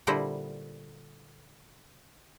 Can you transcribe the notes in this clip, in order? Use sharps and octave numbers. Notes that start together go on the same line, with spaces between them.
A#2 D3 G3 E4 C5 D#5